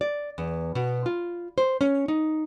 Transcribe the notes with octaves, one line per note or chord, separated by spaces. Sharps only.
D5
E2
B2
F4
C5
C#4
D#4